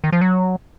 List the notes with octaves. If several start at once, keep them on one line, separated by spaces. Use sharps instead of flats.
D#3
F3
F#3